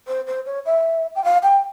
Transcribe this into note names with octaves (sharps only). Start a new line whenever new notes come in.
C5
C5
C#5
E5
G5
F5
G5